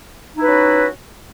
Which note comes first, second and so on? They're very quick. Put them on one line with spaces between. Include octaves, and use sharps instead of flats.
D#4 E4 B4 F#4 C#4